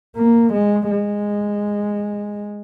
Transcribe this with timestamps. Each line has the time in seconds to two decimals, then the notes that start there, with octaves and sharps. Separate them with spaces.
0.17 A#3
0.53 G#3
0.91 G#3